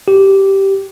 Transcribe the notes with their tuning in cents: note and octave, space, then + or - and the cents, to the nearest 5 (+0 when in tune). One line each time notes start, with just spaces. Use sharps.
G4 -10